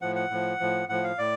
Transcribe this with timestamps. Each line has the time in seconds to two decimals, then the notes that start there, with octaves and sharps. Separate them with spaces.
0.02 A2 F3 F#5
0.16 F#5
0.30 A2 F3
0.60 A2 F3
0.89 A2 F3 F#5
1.03 F5
1.18 A2 D5